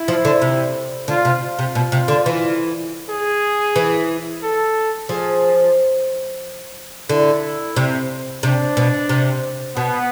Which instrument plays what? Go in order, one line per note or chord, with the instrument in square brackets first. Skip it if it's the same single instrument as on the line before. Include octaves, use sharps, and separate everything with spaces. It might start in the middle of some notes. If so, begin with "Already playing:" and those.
Already playing: [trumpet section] E4
[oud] F3
D3
C3
[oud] D3 [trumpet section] F4
[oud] C3
[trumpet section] F4
[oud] C3
B2
C3
D3
E3
[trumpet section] G#4
[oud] E3
[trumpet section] A4
[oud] F3 [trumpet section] G#4
[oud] D3 [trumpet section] E4
[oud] C3
[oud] C3 [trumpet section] D4
[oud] B2
C3
[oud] B2 [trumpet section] B3